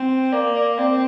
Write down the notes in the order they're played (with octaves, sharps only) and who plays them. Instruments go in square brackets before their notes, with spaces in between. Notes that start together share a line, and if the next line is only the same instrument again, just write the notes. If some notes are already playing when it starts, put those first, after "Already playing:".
Already playing: [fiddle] C4
[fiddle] A#3 [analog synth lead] D5
[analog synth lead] D5
[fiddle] C4 [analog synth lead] D5